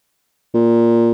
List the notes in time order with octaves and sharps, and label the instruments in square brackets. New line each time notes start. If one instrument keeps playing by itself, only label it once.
[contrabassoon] A#2